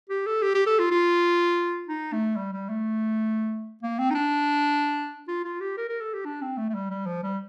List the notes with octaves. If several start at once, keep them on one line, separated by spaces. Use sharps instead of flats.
G4
A4
G4
G4
A4
F4
F4
D#4
A3
G3
G3
A3
A#3
C4
D#4
D4
F4
F4
G4
A#4
A#4
A4
G4
D4
C4
A3
A3
G3
G3
F3
G3